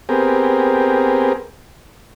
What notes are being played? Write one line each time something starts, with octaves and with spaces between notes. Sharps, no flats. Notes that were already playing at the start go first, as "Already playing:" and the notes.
B3 C4 G4 G#4 A#4